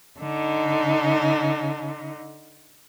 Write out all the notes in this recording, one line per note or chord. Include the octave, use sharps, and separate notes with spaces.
D3 D#4